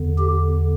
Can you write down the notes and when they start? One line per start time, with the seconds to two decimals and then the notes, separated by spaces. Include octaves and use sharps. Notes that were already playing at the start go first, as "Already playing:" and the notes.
Already playing: E2 D3
0.18 G4